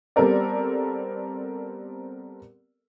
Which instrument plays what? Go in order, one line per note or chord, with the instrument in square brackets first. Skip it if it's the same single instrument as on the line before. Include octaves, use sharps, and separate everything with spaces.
[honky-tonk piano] G3 B3 C4 A4 A#4 D5